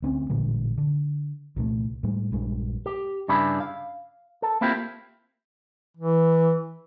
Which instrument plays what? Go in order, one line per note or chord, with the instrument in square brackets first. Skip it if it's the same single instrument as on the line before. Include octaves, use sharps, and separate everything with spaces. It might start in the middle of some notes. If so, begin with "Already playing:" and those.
[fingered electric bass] D2 C4 C#4
A1 A#2 D3 G#3
D3
C2 A#2 F3 A3
A2 G3 G#3
A#1 G2 G#3
[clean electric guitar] G4
G2 C#3 D4 E4 G#4 B5
F5
A4
A#3 C4 E4 F4 G4
[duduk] E3